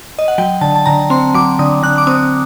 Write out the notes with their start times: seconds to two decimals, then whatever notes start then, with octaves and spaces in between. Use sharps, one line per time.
0.19 D#5
0.28 F#5
0.38 F#3 G5
0.61 D3 A5
0.76 A5
0.86 D3 A#5
1.10 C4 C6
1.34 F#3 D6
1.59 D3 D#6
1.83 D3 F#6
1.98 D6
2.07 C4 D#6